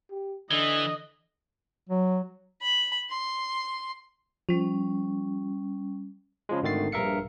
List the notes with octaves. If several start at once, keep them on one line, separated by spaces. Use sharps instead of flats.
G4
D3 E3 D#5
F#3
B5
C6
F3 G3 C#4
C#3 F3 G#3
G#1 D3 D#3 A3 A6 C7
A#1 G2 A#4 E5 F5 C#7